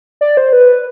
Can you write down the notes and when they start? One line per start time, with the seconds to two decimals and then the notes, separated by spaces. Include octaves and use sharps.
0.21 D5
0.37 C5
0.53 B4